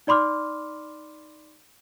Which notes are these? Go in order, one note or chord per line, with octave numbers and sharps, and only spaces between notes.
D#4 D5 B5 C6 D6 F6